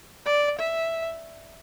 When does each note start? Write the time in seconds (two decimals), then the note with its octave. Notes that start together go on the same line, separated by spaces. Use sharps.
0.26 D5
0.59 E5